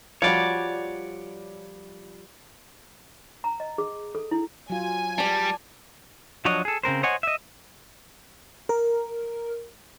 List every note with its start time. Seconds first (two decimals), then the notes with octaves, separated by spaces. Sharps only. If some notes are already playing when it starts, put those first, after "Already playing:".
0.22 F3 G3 F#4 C#5 D5
3.44 A#5
3.60 D#5
3.78 G#4
4.15 A4
4.31 E4
4.70 F#3 F4 G#5
5.18 G3 D5 A5
6.45 F3 F#3 D4 C#5 D#5
6.65 G#4 A4
6.83 C#3 C4 A#4 C5
7.03 C5 C#5 D#5 F#5 G#5
7.23 D#5 E5
8.69 A#4